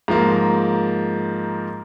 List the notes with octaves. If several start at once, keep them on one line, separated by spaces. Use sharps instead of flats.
G#2 F3 A#3